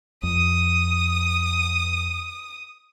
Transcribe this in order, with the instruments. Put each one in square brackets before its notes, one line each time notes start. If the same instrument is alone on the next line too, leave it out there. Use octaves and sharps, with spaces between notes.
[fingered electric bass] F2 [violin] D#6